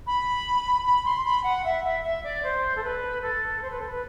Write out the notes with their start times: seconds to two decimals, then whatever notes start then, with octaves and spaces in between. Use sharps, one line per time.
0.06 B5
0.85 B5
1.04 C6
1.24 B5
1.44 F#5
1.64 E5
1.84 E5
2.04 E5
2.23 D5
2.43 C5
2.76 A4
2.83 B4
3.22 A4
3.62 C5
3.71 B4
3.80 A4
3.90 B4